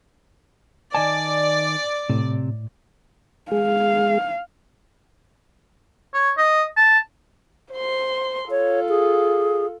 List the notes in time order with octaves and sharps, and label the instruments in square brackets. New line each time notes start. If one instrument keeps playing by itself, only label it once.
[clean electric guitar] D#3 D#5 A5 [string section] D5 [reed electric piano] G#5
[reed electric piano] A2 [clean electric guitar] C3
[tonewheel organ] G#3 G#4 [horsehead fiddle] F5
[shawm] C#5
D#5
A5
[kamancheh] C5 C6
[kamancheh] F4 A4 [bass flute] C#5
[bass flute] G#4